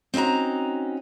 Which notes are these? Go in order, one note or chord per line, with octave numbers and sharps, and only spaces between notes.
C4 C#4 D#4 F#4 A#5